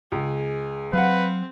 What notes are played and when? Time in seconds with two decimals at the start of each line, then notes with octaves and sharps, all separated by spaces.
0.12 C#2 G#4
0.93 F#3 C4 B4 F5 F#5